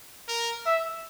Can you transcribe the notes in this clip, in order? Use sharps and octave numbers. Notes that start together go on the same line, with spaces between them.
A#4
E5